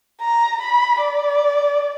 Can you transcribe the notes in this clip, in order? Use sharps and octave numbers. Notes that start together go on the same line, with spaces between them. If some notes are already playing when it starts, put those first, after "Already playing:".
A#5
B5
D5